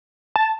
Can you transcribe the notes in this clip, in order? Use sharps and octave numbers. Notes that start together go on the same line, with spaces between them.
A5